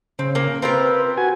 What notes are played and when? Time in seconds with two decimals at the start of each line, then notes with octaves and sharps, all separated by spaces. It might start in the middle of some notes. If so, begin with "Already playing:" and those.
0.19 C#3 C4
0.35 A#3
0.62 C4 F4 A#4 B4
1.17 F#4 G#5